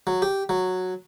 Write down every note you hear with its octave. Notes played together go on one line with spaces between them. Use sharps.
F#3
G4
F#3